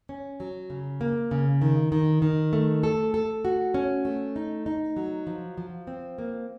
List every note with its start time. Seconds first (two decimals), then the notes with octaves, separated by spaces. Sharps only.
0.09 C#4
0.40 F#3
0.70 C#3
1.01 A#3
1.31 C#3
1.62 D#3
1.92 D#3
2.22 D#3
2.53 A3
2.84 A4
3.14 A4
3.45 F#4
3.74 C#4
4.05 A3
4.36 D#4
4.66 D#4
4.96 F#3
5.27 F3
5.58 F3
5.87 C4
6.18 A#3